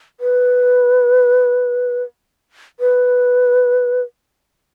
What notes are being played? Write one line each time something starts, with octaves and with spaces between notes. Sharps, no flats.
B4
B4